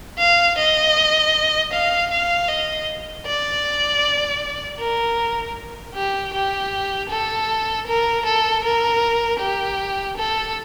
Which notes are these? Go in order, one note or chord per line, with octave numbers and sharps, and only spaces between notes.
F5
D#5
F5
F5
D#5
D5
A#4
G4
G4
A4
A#4
A4
A#4
G4
A4